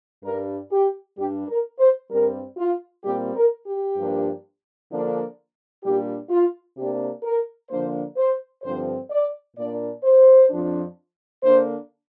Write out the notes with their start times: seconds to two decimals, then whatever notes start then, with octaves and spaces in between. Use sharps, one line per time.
0.24 G2 G3 D4 A#4
0.71 G4
1.17 G2 G3 D4 G4
1.48 A#4
1.79 C5
2.10 G2 G3 C4 A#4
2.57 F4
3.03 A#2 G3 C4 G4
3.35 A#4
3.66 G4
3.97 G2 F3 A#3 D4
4.90 D3 F3 A#3 D4
5.83 A#2 G3 D4 G4
6.29 F4
6.77 C3 A#3 D4 G4
7.23 A#4
7.70 D3 F3 A#3 D4 C5
8.17 C5
8.63 G2 D3 F3 C4 C5
9.10 D5
9.56 A#2 A#3 D4 D5
10.03 C5
10.49 F2 F3 D4
11.42 D3 A#3 D4 C5